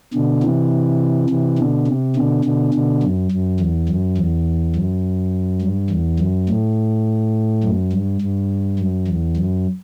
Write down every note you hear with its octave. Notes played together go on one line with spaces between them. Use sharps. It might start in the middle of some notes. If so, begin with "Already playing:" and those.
B2 D3
C3 E3
C3 E3
B2 D3
C3
B2 D3
B2 D3
B2 D3
F#2
F#2
E2
F#2
E2
F#2
G2
E2
F#2
A2
F#2
G2
G2
F#2
E2
F#2